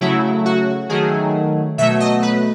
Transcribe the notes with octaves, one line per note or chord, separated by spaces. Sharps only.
C#3 F#3 A3 E4
F#4
D#3 F#3 A3 G#4
B2 F#3 A3 E5
D#5
B4